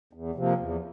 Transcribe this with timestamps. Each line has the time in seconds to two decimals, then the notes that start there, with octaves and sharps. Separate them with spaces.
0.13 E2
0.35 C3 F3 A#3
0.58 E2